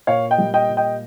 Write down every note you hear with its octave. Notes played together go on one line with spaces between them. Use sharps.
A#2 C#5 F5
D#5 G5
G3
D#5 G5
A#2
D#5 G5